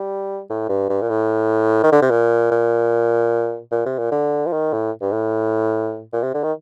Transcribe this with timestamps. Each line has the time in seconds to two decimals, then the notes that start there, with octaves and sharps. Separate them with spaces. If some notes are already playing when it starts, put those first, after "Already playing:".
Already playing: G3
0.50 A2
0.69 G2
0.89 G2
1.02 A#2
1.09 A2
1.83 D#3
1.92 D3
2.02 C3
2.10 A#2
2.51 A#2
3.71 A#2
3.86 C3
3.98 A#2
4.11 D3
4.46 F3
4.52 D#3
4.73 A2
5.01 G2
5.12 A2
6.13 A#2
6.23 C3
6.34 D3
6.43 D#3